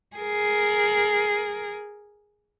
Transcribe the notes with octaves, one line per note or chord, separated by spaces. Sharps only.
G#4 A#4